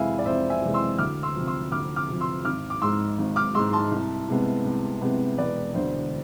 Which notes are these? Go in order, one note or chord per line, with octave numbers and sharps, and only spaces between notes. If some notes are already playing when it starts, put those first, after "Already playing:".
Already playing: F2 C3 E3 G#3 E5 F5 G#5 B5
D5
F2 C5 E5
E5 G#5
C3 E3 G#3
C6 E6
D2 D6 F6
C6 E6
C3 F3
C6 E6
D2 D6 F6
D6 F6
C3 F3
C6 E6
G#1 D6 F6
D6
G#2 G#3 C6 E6
G#1
D6 F6
G#2 G#3 C6 E6
A5 C6
C2
C3 G#3 B3
C2
C3 G#3 B3
E1 B4 D5
D2 D3 C5